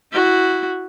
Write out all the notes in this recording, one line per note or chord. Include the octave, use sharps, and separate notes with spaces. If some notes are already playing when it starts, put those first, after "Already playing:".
E4 F#4